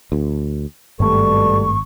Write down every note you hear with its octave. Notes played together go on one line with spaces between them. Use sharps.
D2
G#1 G2 B2 G3 A3 A4 C#6